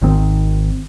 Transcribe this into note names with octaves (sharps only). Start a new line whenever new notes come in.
G#1 G#2 D#3 C4